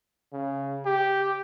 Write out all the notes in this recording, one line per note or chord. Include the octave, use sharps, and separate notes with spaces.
C#3
G4